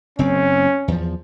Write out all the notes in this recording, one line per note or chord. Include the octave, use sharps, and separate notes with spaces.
F#1 C4 C#4
E2 F3